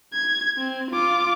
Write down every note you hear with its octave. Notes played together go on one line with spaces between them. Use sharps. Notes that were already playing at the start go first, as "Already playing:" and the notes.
G#6
C4
F4 D6